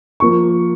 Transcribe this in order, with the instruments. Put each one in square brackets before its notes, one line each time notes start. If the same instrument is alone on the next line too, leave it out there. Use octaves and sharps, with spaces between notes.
[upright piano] F3 A#3 C#6